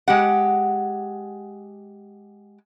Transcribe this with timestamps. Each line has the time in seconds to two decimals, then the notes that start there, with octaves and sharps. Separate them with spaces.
0.08 G#3 G4 F#5